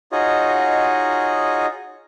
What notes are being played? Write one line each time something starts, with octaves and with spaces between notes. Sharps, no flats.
D#4 F4 F#4 G#4 C#5 D#5